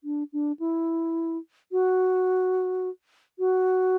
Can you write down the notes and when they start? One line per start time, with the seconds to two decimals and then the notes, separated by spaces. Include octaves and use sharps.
0.04 D4
0.33 D4
0.59 E4
1.72 F#4
3.39 F#4